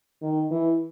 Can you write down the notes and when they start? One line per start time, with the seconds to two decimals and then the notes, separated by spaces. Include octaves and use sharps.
0.22 D#3
0.51 E3